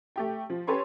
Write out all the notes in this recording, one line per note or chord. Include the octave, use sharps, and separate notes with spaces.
A3 G4 G5
F3
C#4 G4 A4 B4 C#5 C6